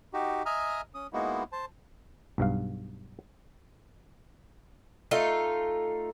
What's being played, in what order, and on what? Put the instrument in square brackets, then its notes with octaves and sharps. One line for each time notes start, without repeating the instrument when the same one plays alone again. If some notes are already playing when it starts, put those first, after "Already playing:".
[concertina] D#4 F#4 G4
D#5 E5 G#5 A#5 D#6 F6
C#4 D#6
G#3 A#3 B3 D#4 E4 F#4
C5 A5
[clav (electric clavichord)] B1 G2 F5
[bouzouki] A3 D#4 F4